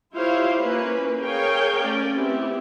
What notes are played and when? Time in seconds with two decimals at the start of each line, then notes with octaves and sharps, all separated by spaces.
0.14 E4 F4 G4 C5 C#5 F5
0.61 A#3 C#4 B4
1.21 G#4 A#4 C#5 F5 G5 G#5
1.82 A3 C#4 D5
2.12 B3 C4 E4 G4